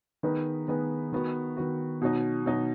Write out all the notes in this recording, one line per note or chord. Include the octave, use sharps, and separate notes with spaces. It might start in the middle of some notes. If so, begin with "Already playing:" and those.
D#3 B3 D#4 G#4 B4
D#3 B3 D#4 G#4 B4
D#3 B3 F#4
D#3 B3 F#4
B2 F#3 D#4
B2 F#3 D#4